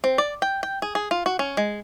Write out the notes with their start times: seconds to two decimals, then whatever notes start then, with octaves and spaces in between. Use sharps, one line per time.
0.04 C4
0.18 D5
0.42 G5
0.63 G5
0.82 G#4
0.95 G#4
1.11 F4
1.26 F#4
1.39 C#4
1.57 G#3